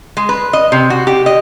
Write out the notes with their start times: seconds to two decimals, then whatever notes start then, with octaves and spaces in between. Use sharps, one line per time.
0.17 G#3
0.29 B4
0.53 D#5
0.72 C3
0.90 F#4
1.07 G4
1.26 D#5